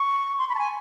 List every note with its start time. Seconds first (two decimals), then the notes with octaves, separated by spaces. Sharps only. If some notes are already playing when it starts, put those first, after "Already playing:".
Already playing: C#6
0.39 C6
0.49 B5
0.55 A5
0.59 G#5